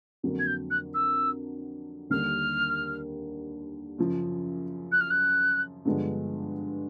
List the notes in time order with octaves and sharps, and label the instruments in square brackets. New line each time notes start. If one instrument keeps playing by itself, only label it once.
[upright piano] F2 D3 F#3 A#3
[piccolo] G#6
G6
F#6
E6
[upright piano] D#2 D3 G3 A#3 D4 [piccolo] F6
[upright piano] F#2 C#3 F3
[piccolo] F#6
F6
F#6
[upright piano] G2 D3 F3 G#3 B3